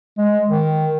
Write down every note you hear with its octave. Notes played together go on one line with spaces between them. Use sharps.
G#3
D#3